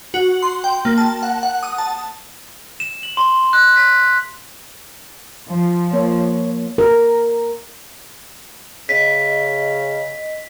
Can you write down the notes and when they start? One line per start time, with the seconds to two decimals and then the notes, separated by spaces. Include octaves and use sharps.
0.14 F#4
0.42 C6
0.64 G5
0.85 A#3
0.98 A5
1.23 F#5
1.43 F#5
1.63 D#6
1.78 A5
2.80 E7
3.03 F#7
3.17 C6
3.53 F#6
3.76 B6
5.48 F3
5.93 A#3 C#5
6.78 A#4
8.89 C#3 D#5 B6